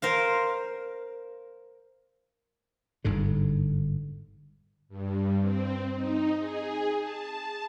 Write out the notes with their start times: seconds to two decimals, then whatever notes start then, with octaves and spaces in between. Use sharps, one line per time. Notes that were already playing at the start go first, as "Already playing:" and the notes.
0.02 A#4 C5 F5
3.04 G1 G#2 D3
4.89 G2
5.40 C4
5.94 D#4
6.37 G#4
7.00 A5